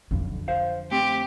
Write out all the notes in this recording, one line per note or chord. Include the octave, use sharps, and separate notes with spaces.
B1 F2 D3
C5 F5
A3 C4 G4